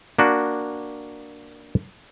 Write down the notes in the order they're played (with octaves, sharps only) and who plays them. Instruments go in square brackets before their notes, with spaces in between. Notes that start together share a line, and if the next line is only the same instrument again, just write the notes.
[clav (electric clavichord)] A#3 D4 F#4